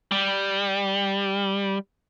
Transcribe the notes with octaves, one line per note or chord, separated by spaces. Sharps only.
G3